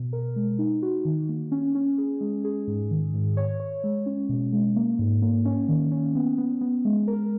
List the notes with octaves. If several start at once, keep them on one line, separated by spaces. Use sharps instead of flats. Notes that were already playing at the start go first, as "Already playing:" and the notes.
Already playing: B2
A#4
G#3
D#4
F#4
D#3
A#3
C#4
C#4
G#4
G#3
G#4
G#2
D#3
G#2
C#5
C#5
G#3
C#4
B2
G#3
A#3
G#2
A#3
C#4
D#3
C#4
B3
B3
B3
G#3
A#4